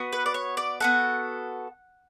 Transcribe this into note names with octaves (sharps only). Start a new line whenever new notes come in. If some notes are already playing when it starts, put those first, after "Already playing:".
Already playing: B3 F#4
B4
D5
C#5
D5
B3 F#4 A4 F#5